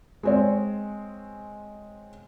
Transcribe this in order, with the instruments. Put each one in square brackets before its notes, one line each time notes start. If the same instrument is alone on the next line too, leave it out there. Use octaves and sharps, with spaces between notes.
[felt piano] G#3 C4 C#5